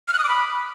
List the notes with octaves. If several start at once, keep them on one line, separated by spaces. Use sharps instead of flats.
F6
F#6
D#6
D6
B5